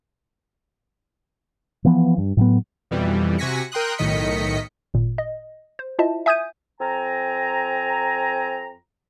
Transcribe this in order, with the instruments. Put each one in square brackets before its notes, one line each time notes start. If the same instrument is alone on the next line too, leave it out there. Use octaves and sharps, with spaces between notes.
[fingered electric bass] E3 F3 B3
G2
A2 F#3 B3
[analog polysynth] F2 B2 E3 G3
C3 F#4 G#5 A#6 B6 C#7
A#4 G5 C6 D#6 F#6
B1 A2 D#3 D#5 B6 C#7
[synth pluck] G#1 A#2
D#5
C5
E4 F4 C5 D#5 E5 A5
E5 G#5 D#6 G6 G#6 D#7
[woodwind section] F2 C4 G#5 A#5